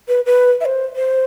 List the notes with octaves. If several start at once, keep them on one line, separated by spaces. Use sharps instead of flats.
B4
B4
E5
C5
C5